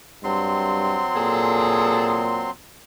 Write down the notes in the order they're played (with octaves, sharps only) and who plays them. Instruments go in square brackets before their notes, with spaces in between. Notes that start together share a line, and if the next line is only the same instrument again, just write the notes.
[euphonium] G2 [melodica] F#3 C4 C6
[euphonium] A#2 [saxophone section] G#4 A4